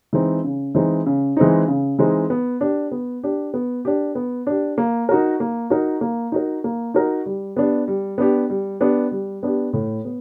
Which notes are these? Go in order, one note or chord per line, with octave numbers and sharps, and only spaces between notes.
E3 G#3 C4 D#4
C#3
E3 G#3 C4 D#4
C#3
E3 G#3 C4 D#4
C#3
E3 G#3 C4 D#4
B3
D4 G4
B3
D4 G4
B3
D4 G4
B3
D4 G4
A#3
D#4 F#4 A#4
A#3
D#4 F#4 A#4
A#3
D#4 F#4 A#4
A#3
D#4 F#4 A#4
G3
B3 D4 G4
G3
B3 D4 G4
G3
B3 D4 G4
G3
B3 D4 G4
A2
B3